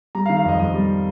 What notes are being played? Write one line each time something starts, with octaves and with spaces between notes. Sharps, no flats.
G3 A#5
F5
D#3
F5
F2 D#5
F2 D#5
G3